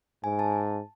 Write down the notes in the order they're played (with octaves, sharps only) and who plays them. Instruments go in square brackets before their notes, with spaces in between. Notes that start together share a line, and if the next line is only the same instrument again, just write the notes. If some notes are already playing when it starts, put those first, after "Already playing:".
[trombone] G#2 [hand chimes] G#5
[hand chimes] A5